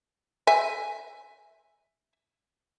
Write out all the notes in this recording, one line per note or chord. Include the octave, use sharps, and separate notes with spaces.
E5 G#5